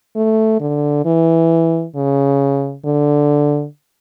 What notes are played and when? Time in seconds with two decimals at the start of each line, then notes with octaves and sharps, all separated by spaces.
0.16 A3
0.60 D3
1.05 E3
1.95 C#3
2.85 D3